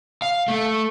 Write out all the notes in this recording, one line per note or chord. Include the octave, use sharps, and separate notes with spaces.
F5
A3